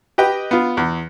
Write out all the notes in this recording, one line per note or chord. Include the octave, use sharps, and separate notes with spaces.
G4 B4 D#5 G5
B3 F4
E2